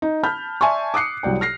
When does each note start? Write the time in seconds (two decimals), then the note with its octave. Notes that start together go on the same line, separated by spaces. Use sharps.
0.02 D#4
0.23 A5 B5 F6 G6
0.61 D5 E5 G#5 A5 C6 C#6
0.94 D6 D#6 F#6 C7 C#7
1.23 C2 F#3 D5 G5
1.41 F6 A#6 C7